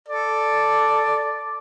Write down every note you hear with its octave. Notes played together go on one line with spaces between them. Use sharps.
A4 D5